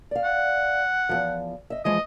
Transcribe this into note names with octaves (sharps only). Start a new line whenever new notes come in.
D5 F5
F#5
E2 G#2 F3
D#5 E5
E3 F3 G#3 D#5